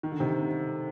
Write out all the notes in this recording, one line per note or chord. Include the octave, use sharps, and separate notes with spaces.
D#3
D3
C3 D#3